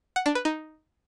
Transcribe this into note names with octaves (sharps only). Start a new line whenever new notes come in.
F#5
D4
B4
D#4